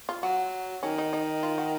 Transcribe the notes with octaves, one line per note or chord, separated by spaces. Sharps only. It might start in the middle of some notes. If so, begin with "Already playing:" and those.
F4
F#3 F#4
D#3 C#4
D#4
D#4
F4
F#4